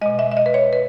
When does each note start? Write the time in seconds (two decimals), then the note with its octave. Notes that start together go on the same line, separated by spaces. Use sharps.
0.01 B2 G#3 D#5
0.19 E5
0.32 E5
0.37 D#5
0.46 B4
0.54 C#5
0.73 B4